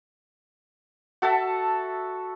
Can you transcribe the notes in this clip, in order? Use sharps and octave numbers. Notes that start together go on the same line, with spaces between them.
F#4 A4 E5 A5